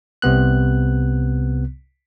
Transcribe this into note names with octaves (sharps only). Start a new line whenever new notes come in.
C2 C3 B3 F#6